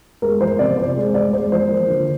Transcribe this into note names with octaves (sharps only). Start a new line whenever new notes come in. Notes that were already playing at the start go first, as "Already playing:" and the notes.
G#3 A#4
F3 C5
C3 D5
C3 C5
G#3
G#3 D5
G#3 C5
F3 C5
A#3
D3